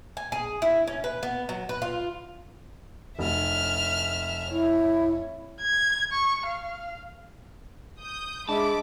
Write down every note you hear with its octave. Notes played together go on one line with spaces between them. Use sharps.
G#5
G#4
E4
C#4
B4
B3
F#3
B4
F4
F1 E5 F6
E4 C#5
G#6
C#6
F5
D#6 G6
G#3 D4 D#5 E5 A5 B5 D6